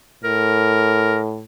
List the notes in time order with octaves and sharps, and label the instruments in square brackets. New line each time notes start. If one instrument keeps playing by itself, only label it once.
[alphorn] A2 [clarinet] A#4